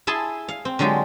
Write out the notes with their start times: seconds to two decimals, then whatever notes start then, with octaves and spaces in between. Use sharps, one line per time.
0.07 E4 G#4 A5 C6
0.48 F5
0.65 C4
0.79 D3 F#3 G#3 F4 G4